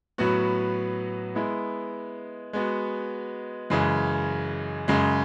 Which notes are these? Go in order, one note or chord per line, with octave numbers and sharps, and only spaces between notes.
A2 F#3 B3 F#4
G#3 B3 E4
G#3 B3 F#4
F#2 C#3 E3 G#3
F#2 C#3 G#3